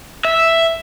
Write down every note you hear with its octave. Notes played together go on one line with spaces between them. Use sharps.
E5